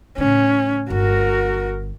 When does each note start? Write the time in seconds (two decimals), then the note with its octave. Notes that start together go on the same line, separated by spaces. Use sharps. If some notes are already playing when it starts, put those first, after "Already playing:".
0.18 A2 C#3 C#4
0.90 G1 F#4 A#4